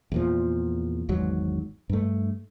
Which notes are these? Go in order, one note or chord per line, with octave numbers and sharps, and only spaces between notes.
E2 A#2 F3
G#1 E2 G#2 F#3
G2 A3